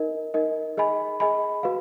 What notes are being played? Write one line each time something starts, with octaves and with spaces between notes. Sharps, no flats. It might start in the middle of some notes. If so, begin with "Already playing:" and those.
Already playing: D#4 A#4 D#5
D#4 A#4 D#5
G#4 D#5 G#5 B5
G#4 D#5 G#5 B5
F#4 B4 F5